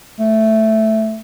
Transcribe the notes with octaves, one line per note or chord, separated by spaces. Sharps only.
A3